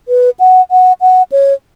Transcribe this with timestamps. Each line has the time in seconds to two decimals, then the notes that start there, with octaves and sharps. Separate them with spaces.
0.08 B4
0.40 F#5
0.71 F#5
1.01 F#5
1.32 C#5